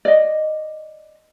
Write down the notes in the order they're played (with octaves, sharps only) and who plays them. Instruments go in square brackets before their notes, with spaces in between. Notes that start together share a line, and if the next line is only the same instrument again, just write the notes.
[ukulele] D5 D#5